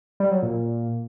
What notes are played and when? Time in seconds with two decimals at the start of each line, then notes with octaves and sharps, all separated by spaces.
0.20 G3
0.31 F#3
0.43 A#2